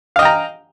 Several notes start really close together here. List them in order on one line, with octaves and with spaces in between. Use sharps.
F5 D#5 G5 A#5